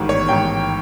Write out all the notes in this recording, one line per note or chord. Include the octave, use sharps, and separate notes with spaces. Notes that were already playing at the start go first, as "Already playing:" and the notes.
Already playing: A1 G#2 D#3
C#5
A1 G#2 D#3 G5